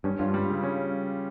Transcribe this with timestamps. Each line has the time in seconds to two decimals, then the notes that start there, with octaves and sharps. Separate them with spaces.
0.04 G2 C#4
0.19 G2 F4
0.34 G3
0.50 C#3
0.63 C#4